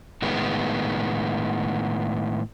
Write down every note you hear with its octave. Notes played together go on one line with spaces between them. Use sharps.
A2 D#3 G#3 B3